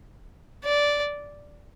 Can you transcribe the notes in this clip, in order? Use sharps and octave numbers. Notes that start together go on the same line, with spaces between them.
D5